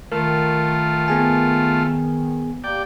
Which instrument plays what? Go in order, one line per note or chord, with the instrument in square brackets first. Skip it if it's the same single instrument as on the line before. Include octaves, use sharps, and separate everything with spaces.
[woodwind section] D#3 [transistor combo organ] A3 F4 [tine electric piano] A#4
[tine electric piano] B3 G#4 G#5
[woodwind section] A#3 G4 [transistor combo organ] D5 G5